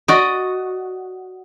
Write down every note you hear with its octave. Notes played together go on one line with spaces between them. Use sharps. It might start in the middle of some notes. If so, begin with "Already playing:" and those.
F#4 D5 D#5